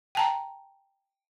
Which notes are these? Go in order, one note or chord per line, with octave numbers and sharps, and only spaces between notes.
G5 A5 A#5